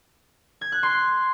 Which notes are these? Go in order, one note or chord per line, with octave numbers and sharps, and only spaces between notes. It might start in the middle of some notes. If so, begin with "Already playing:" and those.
G#6
F#6
C6